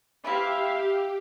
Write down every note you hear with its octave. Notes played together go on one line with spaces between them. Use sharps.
E3 C4 E4 G4 E5 F5